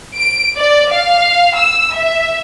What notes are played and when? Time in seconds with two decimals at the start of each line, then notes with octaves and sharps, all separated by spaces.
0.17 D7
0.57 D5
0.91 F5
1.56 E6
1.93 E5